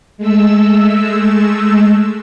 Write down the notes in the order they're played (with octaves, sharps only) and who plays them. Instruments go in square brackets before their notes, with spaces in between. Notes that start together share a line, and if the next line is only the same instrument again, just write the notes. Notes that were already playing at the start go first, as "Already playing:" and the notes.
[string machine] G#3 A3 E6